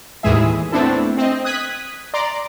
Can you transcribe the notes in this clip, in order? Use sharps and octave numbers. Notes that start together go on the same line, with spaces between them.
D#2 A2 E3 G#3 G#4 E5
A3 B3 C4 D4 E4 A4
C4 D#5
D#6 F#6 G#6 B6 D#7
D5 A#5 C6 D6